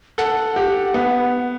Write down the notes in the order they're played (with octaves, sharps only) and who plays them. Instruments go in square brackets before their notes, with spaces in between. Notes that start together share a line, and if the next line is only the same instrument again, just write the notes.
[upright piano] A4 [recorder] F#5
[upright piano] G4
B3